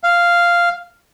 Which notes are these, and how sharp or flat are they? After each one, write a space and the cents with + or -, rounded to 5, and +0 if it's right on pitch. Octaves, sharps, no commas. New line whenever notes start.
F5 -5